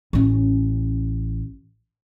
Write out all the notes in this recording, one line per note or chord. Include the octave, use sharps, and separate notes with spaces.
A1 C#4